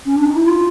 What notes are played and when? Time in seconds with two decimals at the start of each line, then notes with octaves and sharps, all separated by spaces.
0.05 C#4
0.16 D4
0.25 D#4
0.36 E4
0.46 F4